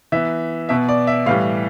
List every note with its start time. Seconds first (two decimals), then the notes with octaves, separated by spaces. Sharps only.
0.12 E3 B3 E5
0.69 B2 B3 E5
0.89 D5
1.07 E5
1.26 A2 E3 G3 F5